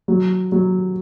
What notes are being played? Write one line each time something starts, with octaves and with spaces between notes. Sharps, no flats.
F#3
F#3